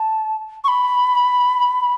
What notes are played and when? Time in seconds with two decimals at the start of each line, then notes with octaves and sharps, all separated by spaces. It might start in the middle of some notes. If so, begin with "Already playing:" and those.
Already playing: A5
0.64 C#6
0.68 B5